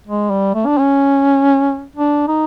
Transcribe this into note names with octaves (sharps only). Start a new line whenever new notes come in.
G#3
G3
A3
D4
C#4
D4
D#4